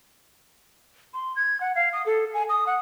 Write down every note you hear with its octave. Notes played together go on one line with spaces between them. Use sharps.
C6
G#6
F#5
F5
D#6
A4
G#5
D#6
F#5